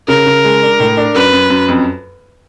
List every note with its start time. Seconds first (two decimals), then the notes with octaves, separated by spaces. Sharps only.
0.08 C#3 A#4
0.26 C#3
0.45 G#3
0.62 D4
0.80 A2
0.97 D4
1.15 F#2 B4
1.33 F#2
1.50 F#2
1.68 F2